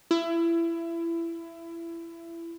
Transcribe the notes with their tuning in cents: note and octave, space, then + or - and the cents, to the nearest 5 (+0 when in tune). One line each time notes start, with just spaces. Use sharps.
E4 +25